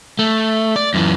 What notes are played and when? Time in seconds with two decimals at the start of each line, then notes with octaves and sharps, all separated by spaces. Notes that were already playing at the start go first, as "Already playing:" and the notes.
0.19 A3
0.76 D5
0.94 F#2 E3